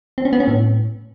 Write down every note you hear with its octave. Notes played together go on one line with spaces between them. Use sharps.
C4
C#4
B3
C#4
A2